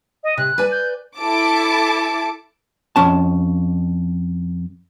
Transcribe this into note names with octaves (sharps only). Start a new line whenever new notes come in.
D#5
C3 F#6
B4 D5 G#5
G6
E4 A4 A5 D6 D7
F2 C#4 A5